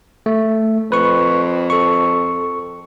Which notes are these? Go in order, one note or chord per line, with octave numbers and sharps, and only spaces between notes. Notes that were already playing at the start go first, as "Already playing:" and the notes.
A3
F2 B4 C#6
A4 C#6